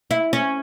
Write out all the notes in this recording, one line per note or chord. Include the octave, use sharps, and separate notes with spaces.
E4
C#4